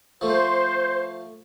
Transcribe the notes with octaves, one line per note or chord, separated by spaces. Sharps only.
F3 A3 C5